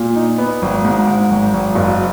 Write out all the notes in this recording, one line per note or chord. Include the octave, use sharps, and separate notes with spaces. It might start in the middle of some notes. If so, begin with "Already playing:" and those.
Already playing: A#2
D#4
B3
G#1
G#2
G#2
G#1
G#1
F#1